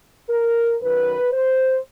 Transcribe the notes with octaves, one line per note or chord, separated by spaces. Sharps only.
A#4
F#2 D#3 F#3 B4
C5